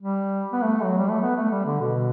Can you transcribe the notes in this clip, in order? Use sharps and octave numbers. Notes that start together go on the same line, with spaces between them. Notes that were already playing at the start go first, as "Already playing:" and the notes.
G3
B3
A3
F#3
G3
A3
B3
A3
G3
D3
B2